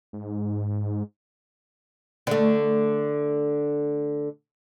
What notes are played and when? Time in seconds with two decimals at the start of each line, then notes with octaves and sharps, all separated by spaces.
0.13 G#2
2.27 D3 A3